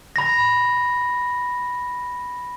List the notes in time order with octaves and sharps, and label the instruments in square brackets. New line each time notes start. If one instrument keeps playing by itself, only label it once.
[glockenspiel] B5 A#6